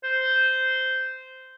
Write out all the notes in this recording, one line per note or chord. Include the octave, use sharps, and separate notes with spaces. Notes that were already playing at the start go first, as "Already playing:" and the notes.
C5